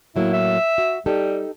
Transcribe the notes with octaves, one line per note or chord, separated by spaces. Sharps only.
A2 F#3 A#3 E4
E5
F#4
G3 D#4 G4 A4